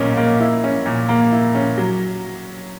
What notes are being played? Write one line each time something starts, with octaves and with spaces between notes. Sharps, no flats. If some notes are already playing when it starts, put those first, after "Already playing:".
Already playing: B1 A#2 A#3 C#4
A#3
E4
C#4
A#2
A#3
E4
C#4
F#3